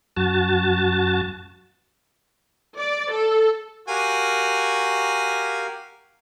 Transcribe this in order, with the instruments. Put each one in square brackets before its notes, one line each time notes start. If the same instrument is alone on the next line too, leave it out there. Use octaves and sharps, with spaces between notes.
[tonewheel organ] F#2 F#4 A5
[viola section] D5
A4
[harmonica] F#4 G#5 [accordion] G4 A#4 F5